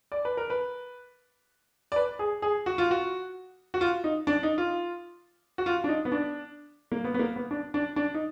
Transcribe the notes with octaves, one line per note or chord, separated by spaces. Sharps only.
D5
B4
A#4
B4
D5
B4
G#4
G#4
F#4
F4
F#4
F#4
F4
D#4
D4
D#4
F4
F#4
F4
D4
D#4
B3
D4
A#3
B3
B3
A#3
B3
D4
D4
D4
D#4